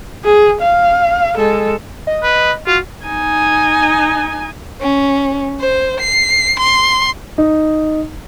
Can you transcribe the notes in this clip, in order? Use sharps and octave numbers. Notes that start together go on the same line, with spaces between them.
G#4
F5
G#3 A4
D#5
B4
F4 F#4
D#4 G#5
C#4
C5
C7
C6
D#4